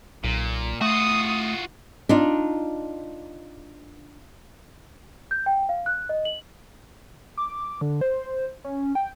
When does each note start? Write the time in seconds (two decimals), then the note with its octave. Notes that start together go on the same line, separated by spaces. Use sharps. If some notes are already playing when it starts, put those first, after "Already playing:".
0.24 B1 A#2
0.81 A3 F4 F#4 D#6
2.09 D4 D#4 F4
5.31 G6
5.46 G5
5.69 F5
5.86 F#6
6.09 D#5
6.25 F#7
7.37 D6
7.81 D3
8.01 C5
8.65 C#4
8.95 G5